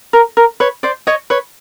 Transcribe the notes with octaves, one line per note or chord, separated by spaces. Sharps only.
A#4
A#4
B4 C#5
C5 D5
C#5 D#5
B4 C#5